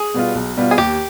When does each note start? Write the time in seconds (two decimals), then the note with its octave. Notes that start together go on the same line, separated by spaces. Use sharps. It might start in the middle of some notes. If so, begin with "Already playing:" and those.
Already playing: G#4
0.14 B2 G3 B3 F4
0.35 B1
0.57 B2 G3 B3 F4
0.71 G#4
0.78 D#2 G4